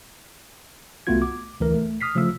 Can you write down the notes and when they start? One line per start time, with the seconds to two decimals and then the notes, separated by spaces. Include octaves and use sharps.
1.07 C2 A3 B3 F4 F#4 G#6
1.22 D6
1.60 D2 E3 A#4
1.74 A3
2.01 D#6 F6 B6 C7
2.15 C#3 F3 A3 F4 E6